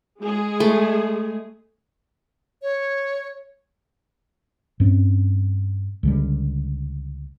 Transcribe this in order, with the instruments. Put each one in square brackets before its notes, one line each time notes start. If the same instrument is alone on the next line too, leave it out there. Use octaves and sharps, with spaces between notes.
[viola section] G#3 G#4
[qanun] A3
[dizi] C#5
[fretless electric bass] G2 C4 C#4
C#2 D3 G3